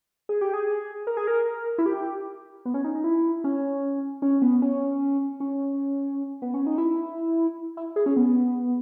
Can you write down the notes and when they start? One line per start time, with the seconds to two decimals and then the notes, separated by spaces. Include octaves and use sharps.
0.29 G#4
0.41 G4
0.54 G#4
1.07 A#4
1.17 G#4
1.27 A#4
1.78 E4
1.86 G4
2.65 B3
2.74 C#4
2.84 D#4
2.95 D#4
3.04 E4
3.44 C#4
4.22 C#4
4.42 B3
4.62 C#4
5.40 C#4
6.42 B3
6.54 C#4
6.67 D#4
6.78 E4
7.77 E4
7.96 G#4
8.06 C#4
8.16 B3